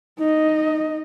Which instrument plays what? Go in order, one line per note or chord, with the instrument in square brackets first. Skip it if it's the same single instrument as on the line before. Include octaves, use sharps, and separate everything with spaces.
[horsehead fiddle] D#4 D#5